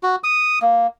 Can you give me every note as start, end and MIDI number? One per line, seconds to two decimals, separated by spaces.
0.03 0.16 66
0.24 0.59 87
0.62 0.87 58